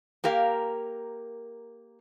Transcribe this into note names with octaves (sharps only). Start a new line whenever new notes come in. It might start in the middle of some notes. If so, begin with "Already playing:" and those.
A#3 G4 A#4 F5